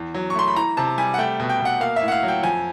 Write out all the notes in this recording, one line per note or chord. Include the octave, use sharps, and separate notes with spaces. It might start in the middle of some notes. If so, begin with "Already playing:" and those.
Already playing: E2
F#3
C#6
A3 C6
B5
E3 A#5
C3 A5
G3 G#5
F#5
A3 G5
B2
G5
B2
F#5
A#3 F5
E5
A2
F#5
F5
F#3
G5
F2 G#5